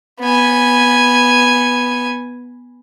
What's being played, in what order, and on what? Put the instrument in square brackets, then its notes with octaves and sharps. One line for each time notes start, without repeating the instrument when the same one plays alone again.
[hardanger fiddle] B3 G#5